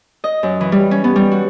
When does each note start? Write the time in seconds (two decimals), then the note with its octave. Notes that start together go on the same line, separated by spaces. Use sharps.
0.24 D#5
0.43 F#2
0.61 E3
0.72 G3
0.91 C#4
1.04 B3
1.16 G3
1.32 F#4